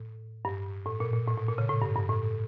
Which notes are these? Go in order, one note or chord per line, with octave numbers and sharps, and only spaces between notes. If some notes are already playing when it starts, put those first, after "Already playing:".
Already playing: A2
G2
A2
A#2
A#2
A2
A2
A#2
C#3
A2
G2
G2
A2